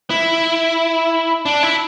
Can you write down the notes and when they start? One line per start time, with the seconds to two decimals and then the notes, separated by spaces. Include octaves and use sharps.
0.10 E4
1.46 D4
1.63 E4